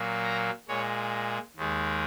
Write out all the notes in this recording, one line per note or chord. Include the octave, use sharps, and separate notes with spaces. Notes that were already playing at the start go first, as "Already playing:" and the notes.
Already playing: A#2 F#3 A#3
A#5
A#2 G#3 C#5
D#2 D#3 G#3